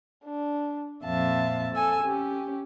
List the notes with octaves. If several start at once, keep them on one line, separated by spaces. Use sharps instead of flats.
D4
F2 A#2 E5 F5 A5
A4 G#5 E6
C#4 G4